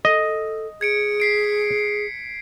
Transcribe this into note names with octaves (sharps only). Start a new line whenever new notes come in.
A4 D#5
G#4 G#6 C#7 D7
B6 C7 D7